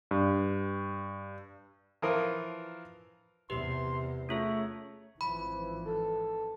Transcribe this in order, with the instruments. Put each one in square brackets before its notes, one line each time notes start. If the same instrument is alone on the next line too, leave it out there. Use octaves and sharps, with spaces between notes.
[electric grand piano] G2
[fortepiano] E3 F3 F4 A#4
[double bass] E2 C3 [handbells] G4 B4 [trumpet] C6
[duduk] A3 [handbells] C#4 F4 G#4 [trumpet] C#5
[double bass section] G#1 E3 F3 [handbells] B5
[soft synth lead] A4